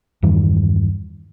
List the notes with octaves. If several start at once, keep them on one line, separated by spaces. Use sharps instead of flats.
E2 G2 D#3 G3